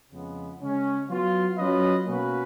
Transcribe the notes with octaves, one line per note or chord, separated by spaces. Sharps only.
F2 C#3 G#3 B3
C#3 G#3 C#4
F#3 B3 F4
F#3 C#4 F4 B4 D#5
B2 A#3 C#4 F#4 B4